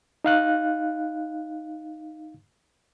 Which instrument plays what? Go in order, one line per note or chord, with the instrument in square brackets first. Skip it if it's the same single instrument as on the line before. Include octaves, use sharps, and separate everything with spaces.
[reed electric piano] D#4 F5 F#6